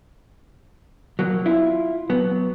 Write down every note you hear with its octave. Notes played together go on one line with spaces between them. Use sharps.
F#3 A#3
E4 F4
F#3 B3